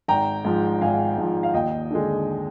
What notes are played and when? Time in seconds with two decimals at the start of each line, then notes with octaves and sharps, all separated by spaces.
0.08 G#1 G5 A#5
0.45 G#2 F3
0.81 G#1 F5 G#5
1.17 G#2 F3
1.43 F5
1.53 D#2 D#5 G5
1.91 D3 G#3